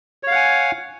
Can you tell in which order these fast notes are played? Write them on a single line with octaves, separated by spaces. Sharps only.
C#5 F5 F#5 G#5